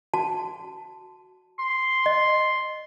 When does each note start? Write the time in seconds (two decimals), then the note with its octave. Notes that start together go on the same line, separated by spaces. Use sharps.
0.14 F#4 A5
1.59 C6
2.06 D#5